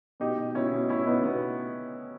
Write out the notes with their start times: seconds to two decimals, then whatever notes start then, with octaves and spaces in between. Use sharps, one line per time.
0.20 B2 D#4 G4
0.38 B2
0.55 B2 C#4 E4
0.73 B2
0.89 B2 C#4 E4
1.06 B2 B3 D#4
1.24 B2 B3